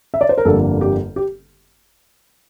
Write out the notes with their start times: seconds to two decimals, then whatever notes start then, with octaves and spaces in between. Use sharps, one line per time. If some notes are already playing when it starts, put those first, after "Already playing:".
0.14 E5
0.21 D5
0.29 C5
0.38 A#4
0.45 G1 F2 D3 G3 A#3 A4
0.81 G4
1.16 G4